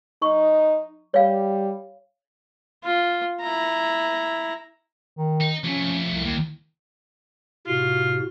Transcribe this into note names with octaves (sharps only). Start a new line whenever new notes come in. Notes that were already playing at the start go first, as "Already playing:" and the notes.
D#4 C#6
G3 C#5 F5
F4
E4 A#5
D#3
D#4
F2 A3 C#4
C2
D#2
A2 C3 F4 F#4